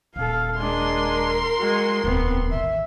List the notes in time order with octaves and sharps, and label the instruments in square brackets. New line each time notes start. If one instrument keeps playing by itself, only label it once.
[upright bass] D#1 [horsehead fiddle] A4 F5
[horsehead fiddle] G#3 D4 [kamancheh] A#4 C6
[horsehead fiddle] G#3 F#4
[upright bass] D1 E2 [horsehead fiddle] B3 C4
[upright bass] A1 D#3 [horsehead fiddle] E5